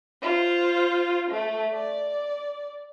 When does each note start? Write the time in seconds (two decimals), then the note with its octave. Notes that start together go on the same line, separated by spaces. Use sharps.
0.22 F4 C5
1.30 A3
1.74 D5